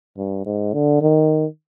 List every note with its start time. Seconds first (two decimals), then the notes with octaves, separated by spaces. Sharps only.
0.17 G2
0.46 G#2
0.73 D3
1.01 D#3